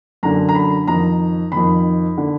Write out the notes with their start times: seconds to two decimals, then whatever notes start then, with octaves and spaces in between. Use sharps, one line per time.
0.23 F#2 D3 A#5
0.49 A#5
0.55 B5
0.88 F2 D#3 A#5
1.52 F2 D#3 B5
2.18 D3